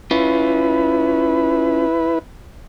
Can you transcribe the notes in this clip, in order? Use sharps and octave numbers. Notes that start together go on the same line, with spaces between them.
C#4 E4 F4 B4